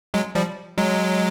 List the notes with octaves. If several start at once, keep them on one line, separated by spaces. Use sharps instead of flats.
F#3 G#3
F3 G3
F#3 G#3